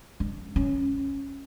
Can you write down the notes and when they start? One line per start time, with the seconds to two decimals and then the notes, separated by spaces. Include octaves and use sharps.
0.20 D4
0.56 C#4